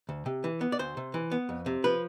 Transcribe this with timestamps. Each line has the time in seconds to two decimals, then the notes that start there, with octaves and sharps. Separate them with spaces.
0.09 D2
0.26 C3
0.44 E3
0.61 B3
0.72 D5
0.79 D2 C5
0.97 C3
1.14 E3
1.31 B3
1.49 F2
1.66 C3
1.84 F3 B4